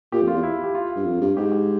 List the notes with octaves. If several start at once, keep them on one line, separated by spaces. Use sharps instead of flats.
A#2 G4
F2
F4
E2
E4
G4
F4
G2
F2
G2
G#2 G4
G4